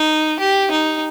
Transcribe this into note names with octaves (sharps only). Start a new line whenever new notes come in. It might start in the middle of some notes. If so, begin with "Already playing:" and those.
Already playing: D#4
G4
D#4